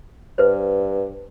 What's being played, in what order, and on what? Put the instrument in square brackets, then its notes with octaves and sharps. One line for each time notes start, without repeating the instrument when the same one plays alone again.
[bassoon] G2 [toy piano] B4 C5